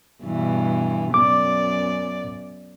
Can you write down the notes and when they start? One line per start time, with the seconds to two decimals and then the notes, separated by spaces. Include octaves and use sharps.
0.24 G2 B2 E3
1.14 F#2 B3 D5 D6